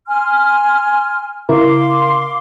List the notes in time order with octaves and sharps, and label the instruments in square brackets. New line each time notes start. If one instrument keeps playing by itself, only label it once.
[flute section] G#5 C6 F6
[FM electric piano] C#3 E4 A#4 [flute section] F5 C6 D6